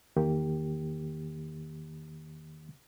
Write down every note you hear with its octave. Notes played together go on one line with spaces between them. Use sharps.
E2 D#3 A#3 G4